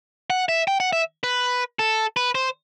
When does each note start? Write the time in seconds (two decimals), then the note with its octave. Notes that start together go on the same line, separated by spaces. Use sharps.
0.30 F#5
0.49 E5
0.67 G5
0.80 F#5
0.93 E5
1.24 B4
1.79 A4
2.16 B4
2.35 C5